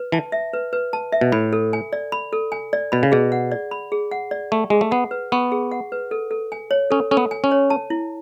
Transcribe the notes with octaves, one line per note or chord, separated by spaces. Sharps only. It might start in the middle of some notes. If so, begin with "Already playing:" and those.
Already playing: B4
E3 A5
E5
B4
B4
A5
E5
B2
A2 B5
A4
G#5
D5
B5
A4
G#5
D5
B2 B5
C#3
B2 G#4
F#5
D5
B5
G#4
F#5
D5
A3 C#6
G#3 G#4
A3
B3 F#5
B4
B3 C#6
G#4
F#5
B4
A4
A4
G#5
C#5
C#4 A4
C#4 A4
B3
G#5
C#4
C#5
A5
E4